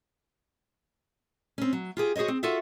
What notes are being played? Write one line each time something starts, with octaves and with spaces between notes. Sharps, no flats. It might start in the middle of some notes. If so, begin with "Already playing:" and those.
C4 C#4
F#3
F4 G4 G#4
F#4 G#4 C5 C#5 D#5
C4
F4 F#4 A4 E5 F#5